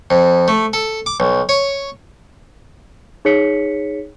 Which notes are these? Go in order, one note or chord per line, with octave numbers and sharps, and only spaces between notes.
F2
A3
A4
D6
B1
C#5
D#4 G#4 C#5 B6 C#7